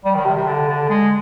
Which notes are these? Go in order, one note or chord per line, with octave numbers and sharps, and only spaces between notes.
G3
D#3
C3
C3
D3
D3
G#3